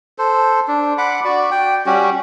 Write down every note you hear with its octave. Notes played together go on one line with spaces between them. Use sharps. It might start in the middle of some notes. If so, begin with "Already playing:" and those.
A4 C5
D4
F#5 B5 D6
F#4 D5
G5
G3 C#4 F#4 G4